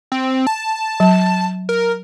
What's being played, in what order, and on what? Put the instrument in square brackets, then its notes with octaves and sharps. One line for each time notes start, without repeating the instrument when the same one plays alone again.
[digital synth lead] C4
A5
[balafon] F#3
[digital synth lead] A#4